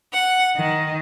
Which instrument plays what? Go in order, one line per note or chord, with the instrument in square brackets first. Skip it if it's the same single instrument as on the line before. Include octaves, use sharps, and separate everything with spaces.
[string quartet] F#5
D#3